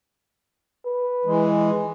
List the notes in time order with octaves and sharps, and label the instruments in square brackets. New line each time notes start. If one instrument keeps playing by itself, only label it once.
[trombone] B4
[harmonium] E3 G#3